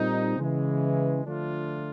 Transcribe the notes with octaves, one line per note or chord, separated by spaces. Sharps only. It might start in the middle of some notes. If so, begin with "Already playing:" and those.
Already playing: A#2 G3 C4 D#4
C#3 E3 G#3
D3 F3 A3 D4 F4